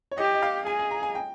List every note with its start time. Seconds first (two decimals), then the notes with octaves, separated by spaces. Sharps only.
0.11 C#5
0.18 G4 D#5
0.34 D#5
0.42 F5
0.66 G#4 G#5
0.80 G#5
0.91 A#5
1.03 G#5
1.15 G5